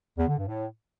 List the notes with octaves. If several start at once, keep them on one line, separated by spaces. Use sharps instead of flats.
E2
D3
G2
A2